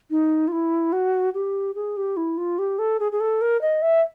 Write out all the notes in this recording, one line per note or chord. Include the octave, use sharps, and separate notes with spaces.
D#4
F4
E4
F#4
G4
G#4
G4
E4
F4
G4
A4
G#4
G#4
A4
A#4
D#5
E5